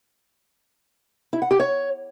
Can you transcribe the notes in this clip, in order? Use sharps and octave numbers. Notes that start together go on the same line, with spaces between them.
E4
F#5
G4
C#5